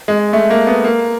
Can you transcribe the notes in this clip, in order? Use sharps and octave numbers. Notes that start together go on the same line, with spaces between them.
G#3
A3
A#3
B3
A#3